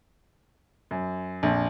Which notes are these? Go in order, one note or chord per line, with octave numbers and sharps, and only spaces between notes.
F#2
A#1 F2